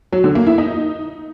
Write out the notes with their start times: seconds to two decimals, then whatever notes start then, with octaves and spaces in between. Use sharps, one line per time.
0.12 F#3
0.24 D3
0.35 A#3
0.47 E4
0.58 D#4